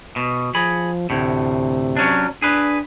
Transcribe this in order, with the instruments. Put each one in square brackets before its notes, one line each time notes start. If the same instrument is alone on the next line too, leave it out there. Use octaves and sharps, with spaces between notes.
[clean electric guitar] B2
[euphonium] F3 [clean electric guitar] G#4 B5
[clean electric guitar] D2 A2 [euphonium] C3
[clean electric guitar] F#3 C#4 D4
[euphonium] D4 [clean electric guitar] G#4 B4